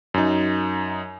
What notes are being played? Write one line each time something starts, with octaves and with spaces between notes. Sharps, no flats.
F#2 D#4